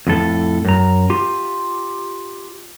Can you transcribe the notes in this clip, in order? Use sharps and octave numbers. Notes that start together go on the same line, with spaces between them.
F2 A2 A4
F#2 A#5
F4 G4